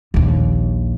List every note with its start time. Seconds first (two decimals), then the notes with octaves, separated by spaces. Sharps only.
0.14 A#1 D#2